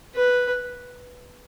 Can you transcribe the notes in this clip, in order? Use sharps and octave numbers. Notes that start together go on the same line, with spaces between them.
B4